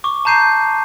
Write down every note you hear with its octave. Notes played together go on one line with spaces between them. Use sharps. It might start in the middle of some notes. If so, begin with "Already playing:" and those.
C#6 D6
A5 A#5 G6 C7 D#7